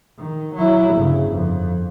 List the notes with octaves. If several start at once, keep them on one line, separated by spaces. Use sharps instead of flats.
D#3
F#3 E4
G1 C#3
F2